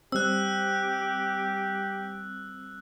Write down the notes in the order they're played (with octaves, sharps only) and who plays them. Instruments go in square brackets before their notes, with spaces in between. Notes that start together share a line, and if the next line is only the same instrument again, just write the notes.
[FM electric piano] G3 C4 [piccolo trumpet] G4 [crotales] E6 F#6